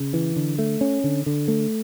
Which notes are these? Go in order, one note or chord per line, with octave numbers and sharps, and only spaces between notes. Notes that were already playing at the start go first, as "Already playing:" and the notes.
Already playing: C#3
E3
D3
A3
C#4
D3
D3
A3